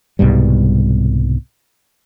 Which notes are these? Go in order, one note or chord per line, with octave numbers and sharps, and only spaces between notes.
C2 G#2 B2 G3